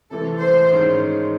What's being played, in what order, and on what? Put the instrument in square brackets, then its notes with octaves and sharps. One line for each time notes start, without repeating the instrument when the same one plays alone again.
[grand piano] C3 E3 A3 [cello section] A4
[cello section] C5
[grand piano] G#2 D#3 G#3 C#4